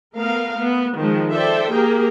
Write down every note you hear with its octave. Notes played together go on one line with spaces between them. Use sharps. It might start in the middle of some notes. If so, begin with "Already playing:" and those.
A3 B3 A#4 F5
B3
D#3 F3 G#3
A4 C5 D5 E5 G5
A#3 G4 G#4 A#4